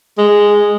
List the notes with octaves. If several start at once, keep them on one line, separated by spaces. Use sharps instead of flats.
G#3